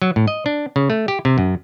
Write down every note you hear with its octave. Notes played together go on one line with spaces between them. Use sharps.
F#3
A2
D#5
D4
C#3
A3
G4
C3
F#2